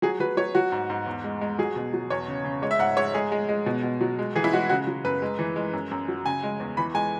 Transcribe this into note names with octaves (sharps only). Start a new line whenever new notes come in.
F#3 G#4
F#3 B4
F#3 C#5
F#3 F#4
G#2
G#2
E2
G#3
G#3
F#3 G#4
B2
F#3
E2 C#5
C#3
C#3
G#3 C#5
E5
G#2 F#5
G#3 C#5
G#3 G#4
G#3
G#3
B2
B2
F#3
G#3
E3 G#4
E4
G#3 F#4
C#3 F#4
F#3
F#2 B4
G#3
E3
G#3
F#2
F#2
F#3
C#3 G#5
G#3
E2
E3 B5
G#3 G#5